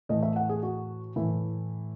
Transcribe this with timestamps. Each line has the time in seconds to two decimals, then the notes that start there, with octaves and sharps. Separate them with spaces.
0.09 A2 E3 A3 D#5
0.23 E5
0.36 F#5
0.49 G#4
0.63 F#4
1.16 A2 E3 A3 E4